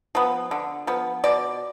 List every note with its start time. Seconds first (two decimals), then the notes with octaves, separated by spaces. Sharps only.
0.15 F3 B3
0.51 D3
0.87 F3 B3
1.24 B2 D5